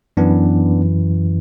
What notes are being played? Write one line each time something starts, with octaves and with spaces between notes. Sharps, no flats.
F#2 E3 B3 D4